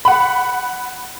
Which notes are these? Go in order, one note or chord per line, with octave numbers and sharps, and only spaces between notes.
F#5 B5